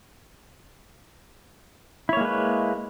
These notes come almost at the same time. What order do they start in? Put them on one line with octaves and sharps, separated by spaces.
E4 C#5 A#3 G#3 B4